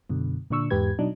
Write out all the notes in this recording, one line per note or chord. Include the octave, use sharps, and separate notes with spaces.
F#2 B2 D3
A#2 D3 D4 C#6 E6
E2 G#2 G4 B4 G#6
B2 F#3 D4 D#4